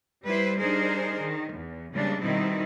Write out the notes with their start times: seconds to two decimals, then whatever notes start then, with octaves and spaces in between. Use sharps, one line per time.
0.23 G3 E4 B4 C5
0.58 G3 D4 D#4 G#4 A#4 C5
1.20 D#3
1.52 E2
1.93 C#3 E3 G3 G#3 A#3 D4
2.22 B2 D#3 G3 C4 D#4 E4